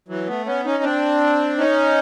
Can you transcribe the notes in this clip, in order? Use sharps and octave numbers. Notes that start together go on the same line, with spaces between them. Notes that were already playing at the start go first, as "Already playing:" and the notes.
E3 F#3
A3 B3
B3 C#4
C#4 D#4
C4 D4
C#4 D#4